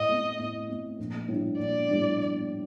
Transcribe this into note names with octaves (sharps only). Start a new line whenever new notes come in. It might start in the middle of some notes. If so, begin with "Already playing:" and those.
Already playing: A2 D#5
A3 C4
A2
A3 C4
A#1
A2 G3 D4
A#1 D5
A2 G3 D4